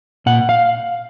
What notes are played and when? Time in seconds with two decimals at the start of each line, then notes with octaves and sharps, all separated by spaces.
0.26 A#2 F#5
0.49 F5